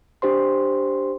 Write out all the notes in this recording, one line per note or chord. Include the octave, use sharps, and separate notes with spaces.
D4 G4 C5 C6